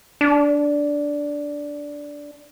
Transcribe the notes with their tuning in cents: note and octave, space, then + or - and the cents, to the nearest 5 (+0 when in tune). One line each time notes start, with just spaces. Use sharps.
D4 -10